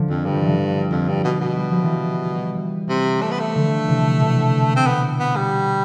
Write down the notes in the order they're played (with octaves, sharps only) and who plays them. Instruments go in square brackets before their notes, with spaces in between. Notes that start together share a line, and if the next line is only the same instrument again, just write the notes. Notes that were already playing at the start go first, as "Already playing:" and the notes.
Already playing: [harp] D3 F3
[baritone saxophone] F2
[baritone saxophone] G2 [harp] G3
[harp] F3
E3
D3 F3
[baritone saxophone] F2
G2
B2
B2
[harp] G3
F3
E3 G3
[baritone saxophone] C3
A3
B3
A3
[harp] D3 F3
C3 E3
B2 D3
[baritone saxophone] C4
B3
B3
G3